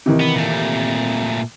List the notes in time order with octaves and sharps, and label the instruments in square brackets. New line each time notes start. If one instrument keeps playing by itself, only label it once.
[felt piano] C3 D#3 E3
[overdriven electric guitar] B3
A#2 A3